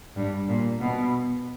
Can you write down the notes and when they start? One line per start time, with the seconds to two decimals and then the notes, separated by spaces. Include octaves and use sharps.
0.16 G2
0.48 A#2
0.80 B2